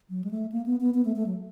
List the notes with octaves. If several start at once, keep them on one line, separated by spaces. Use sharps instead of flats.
F#3
G#3
A3
A#3
B3
B3
B3
A3
A3
F#3